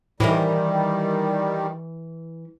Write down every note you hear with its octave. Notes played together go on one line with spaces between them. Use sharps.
A2 D#3 E3 G3 E4 A#4